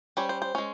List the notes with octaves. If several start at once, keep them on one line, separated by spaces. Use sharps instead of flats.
G3 C#4 C5
C5
C5
G#3 C#4